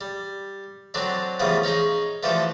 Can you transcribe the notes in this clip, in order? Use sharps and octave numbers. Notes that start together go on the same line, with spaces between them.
G3
D3 F#3 C4 D4
C#3 E3 F3 G3 A3 B3
C#4 D#4 G#4 D#5
D3 E3 F3 A3 G4 A4